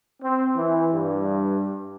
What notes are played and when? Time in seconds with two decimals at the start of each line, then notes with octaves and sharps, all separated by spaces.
0.22 C4
0.55 E3
0.93 G2